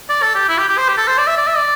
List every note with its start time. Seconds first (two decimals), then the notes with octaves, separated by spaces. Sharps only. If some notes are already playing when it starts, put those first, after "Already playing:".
0.09 D5
0.22 A4
0.35 G4
0.49 E4
0.58 G4
0.69 G4
0.78 C5
0.89 G4
0.98 A4
1.08 C5
1.18 D5
1.27 E5
1.37 D5
1.47 E5
1.57 D5